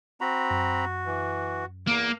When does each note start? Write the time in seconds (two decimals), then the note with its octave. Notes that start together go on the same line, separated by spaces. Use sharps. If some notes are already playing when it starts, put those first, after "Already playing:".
0.21 C4 F#4 A#5 B5
0.50 F#2
1.06 E3
1.87 E2 A#3